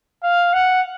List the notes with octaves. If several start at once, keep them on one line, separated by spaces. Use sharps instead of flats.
F5
F#5